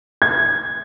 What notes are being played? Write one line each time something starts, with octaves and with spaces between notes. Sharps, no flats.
G#6